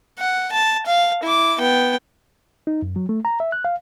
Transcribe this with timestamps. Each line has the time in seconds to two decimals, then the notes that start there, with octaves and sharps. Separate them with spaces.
0.19 F#5
0.52 A5
0.86 F5
1.23 E4 D6
1.59 B3 G5
2.67 D#4
2.82 F#2
2.96 F#3
3.09 A3
3.25 A#5
3.40 E5
3.52 F#6
3.65 F5